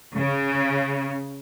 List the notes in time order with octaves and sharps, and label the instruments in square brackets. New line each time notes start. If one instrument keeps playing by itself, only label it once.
[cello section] C#3